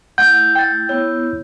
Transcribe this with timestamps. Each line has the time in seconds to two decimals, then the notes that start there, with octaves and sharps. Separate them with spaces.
0.18 A3 E4 F#5 G6
0.55 G5 A6
0.89 B3 E4 C#5